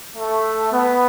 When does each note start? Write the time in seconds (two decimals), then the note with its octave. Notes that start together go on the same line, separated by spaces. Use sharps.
0.16 A3
0.71 B3